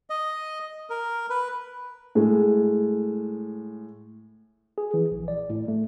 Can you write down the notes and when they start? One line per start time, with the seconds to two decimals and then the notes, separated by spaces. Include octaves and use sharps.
0.10 D#5
0.90 A#4
1.30 B4
2.15 A2 G#3
4.78 G#4
4.94 E3
5.11 A#1
5.28 D5
5.50 A2
5.68 A3